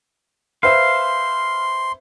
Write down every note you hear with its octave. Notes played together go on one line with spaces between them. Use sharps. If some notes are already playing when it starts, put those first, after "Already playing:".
B4 C5 E5 F5 C6